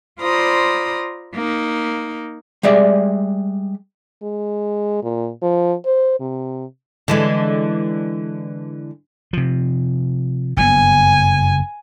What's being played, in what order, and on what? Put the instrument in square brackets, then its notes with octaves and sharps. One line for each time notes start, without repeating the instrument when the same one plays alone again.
[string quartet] F4 C5 D5 A#5 B5 D#6
A#3 D#4
[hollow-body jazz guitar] G3 G#3 D5 E5
[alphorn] G#3
A#2
F3
C5
C3
[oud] D3 E3 G#3
[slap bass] C3 F3
[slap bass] F#1 G2 B3 [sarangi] G#5